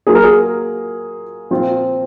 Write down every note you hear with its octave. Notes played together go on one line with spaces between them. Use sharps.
F#3 A#3 F4 G#4
A#4
G#4
A#2 F3 C4 F4